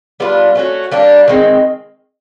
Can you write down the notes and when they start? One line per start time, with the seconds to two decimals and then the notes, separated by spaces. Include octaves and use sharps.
0.20 G3 B3 D4 F4
0.55 A3 C#4 F#4
0.91 G3 A#3 D4
1.28 D#3 G#3 C4